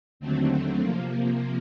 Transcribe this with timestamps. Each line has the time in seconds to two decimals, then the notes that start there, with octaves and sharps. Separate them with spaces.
0.20 D#2 D3 F#3 A3 C4
0.79 C3 F3 A#3